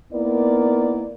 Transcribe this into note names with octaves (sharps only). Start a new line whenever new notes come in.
A#3 B3 D#4 E4 A#4 D5